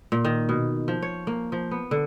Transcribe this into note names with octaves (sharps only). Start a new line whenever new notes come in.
A#2
D#3
B2
F3
C#5
A#3
F3
B3
D3